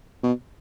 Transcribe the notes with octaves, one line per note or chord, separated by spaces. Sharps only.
B2